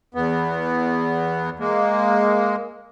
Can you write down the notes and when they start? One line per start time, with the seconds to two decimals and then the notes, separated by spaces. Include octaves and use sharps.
0.15 E2 B3
1.59 G#3 A#3